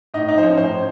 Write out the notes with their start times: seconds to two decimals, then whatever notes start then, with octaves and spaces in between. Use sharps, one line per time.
0.14 A2 D#4 D#5
0.28 D#4 D#5
0.35 F3 C5
0.43 C#4 C#5
0.57 A2 C5